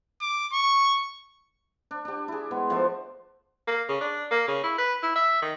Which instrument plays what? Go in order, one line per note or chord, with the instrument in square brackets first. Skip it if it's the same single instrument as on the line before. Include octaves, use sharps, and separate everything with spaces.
[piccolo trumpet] D6
C#6
[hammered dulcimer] D4
D4 G4
E4 G#4
G#3 B3
F3 A3 D4 C5
[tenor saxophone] A#3
C#3
D4
A#3
C#3
E4
B4
E4
E5
D#3